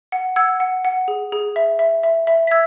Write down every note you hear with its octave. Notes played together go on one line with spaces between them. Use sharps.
F#5
F#5 E6 G#6
F#5
F#5
G#4
G#4
E5
E5
E5
E5
B6
E5 E6 G#6